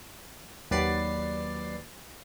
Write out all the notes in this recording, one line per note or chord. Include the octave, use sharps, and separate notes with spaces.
D#2 F#3 B4 D5 A6 C7